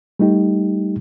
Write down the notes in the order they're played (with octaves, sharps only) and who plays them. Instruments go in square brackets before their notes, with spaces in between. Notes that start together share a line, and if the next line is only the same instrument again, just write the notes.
[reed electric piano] G3 A3 D#4 G4